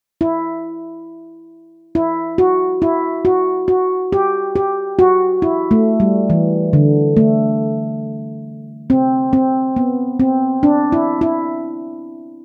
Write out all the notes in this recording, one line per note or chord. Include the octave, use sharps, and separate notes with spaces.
E4
E4
F#4
E4
F#4
F#4
G4
G4
F#4
E4
A3
G3
E3
D3
A3
C4
C4
B3
C4
D4
E4
E4